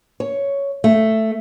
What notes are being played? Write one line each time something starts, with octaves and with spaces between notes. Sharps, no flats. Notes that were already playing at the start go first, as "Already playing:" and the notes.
C#5
A3